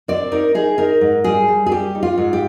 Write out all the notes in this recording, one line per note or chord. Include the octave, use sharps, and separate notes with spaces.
C4 D5
D#4 A#4
D#4 G#4
D#4 A#4
G#2
G3 G#4
G3
G#4
G3 G4
D#4
F4
G#2
G4